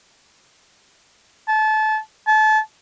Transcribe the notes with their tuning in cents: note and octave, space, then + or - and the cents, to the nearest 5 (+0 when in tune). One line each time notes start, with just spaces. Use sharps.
A5 -25
A5 -30